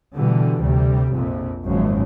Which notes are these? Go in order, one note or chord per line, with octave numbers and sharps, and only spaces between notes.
B2 D3 E3 G3
D2 C3 G3
A#1 F2 A#2
G#1 F#2 A#2 C#3 F3